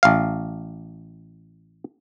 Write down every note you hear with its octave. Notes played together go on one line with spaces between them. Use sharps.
A1 F5